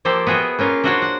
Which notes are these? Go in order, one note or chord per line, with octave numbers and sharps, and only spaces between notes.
F3 A#3 G4 A4 C5 D5
B3 F#4 G#4 E5 G5
A#3 C#4 F4 A#4
D4 F4 F#4 A#4 C5 C#5
F#5